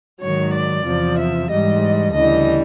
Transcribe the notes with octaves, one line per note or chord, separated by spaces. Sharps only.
G#2 D#3 F#3 C#5
D5
E2 C3 F3
E5
G#2 E3 G3 D#5
D2 C#3 E3 G3 D#5